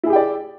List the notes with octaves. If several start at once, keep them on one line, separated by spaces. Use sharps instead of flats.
E4 G4 G#4 D5 G5